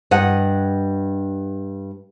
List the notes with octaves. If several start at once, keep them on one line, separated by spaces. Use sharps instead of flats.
G2 D#5 F#5